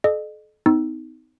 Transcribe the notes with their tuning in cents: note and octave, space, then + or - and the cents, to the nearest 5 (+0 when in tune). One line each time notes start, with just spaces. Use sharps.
A4 -40 D#5 -40
C4 -45 D#4 +15 E6 +0